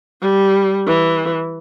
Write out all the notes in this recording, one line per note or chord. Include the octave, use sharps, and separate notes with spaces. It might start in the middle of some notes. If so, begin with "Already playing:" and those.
G3
E3